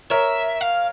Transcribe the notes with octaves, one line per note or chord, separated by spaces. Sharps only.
A#4 C#5 E5
F5